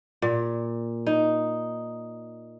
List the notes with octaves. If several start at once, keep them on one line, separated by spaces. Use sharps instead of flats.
A#2
D#4